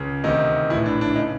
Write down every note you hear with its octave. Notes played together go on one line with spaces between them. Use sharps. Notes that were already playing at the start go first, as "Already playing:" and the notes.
Already playing: C#2 C#3
D2 C3 D#3 D#4
A#1 A2 E3 E4
D4
D4
C#3 D#4